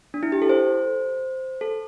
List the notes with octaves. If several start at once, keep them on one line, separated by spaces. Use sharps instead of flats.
D4
E4
G4
A4
C5
A4